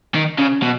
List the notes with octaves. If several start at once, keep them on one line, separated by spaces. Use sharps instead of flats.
D#3
C#3
B2